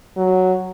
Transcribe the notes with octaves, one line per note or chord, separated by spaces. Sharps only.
F#3